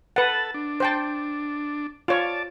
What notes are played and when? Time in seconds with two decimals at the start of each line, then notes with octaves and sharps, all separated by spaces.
0.16 A4 B4 F#5 A5
0.54 D4
0.80 C5 G5 A5
2.08 F4 C#5 D5 A5